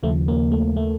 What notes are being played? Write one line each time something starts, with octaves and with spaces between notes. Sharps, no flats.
D#2 C#3 F3 A3
A#3
A3
A3